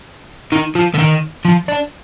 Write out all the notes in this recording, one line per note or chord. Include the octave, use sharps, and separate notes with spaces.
D#3
F3
D3
D#3
F3
D4